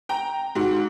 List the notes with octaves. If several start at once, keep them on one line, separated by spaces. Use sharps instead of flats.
G5 A#5
G#2 F#4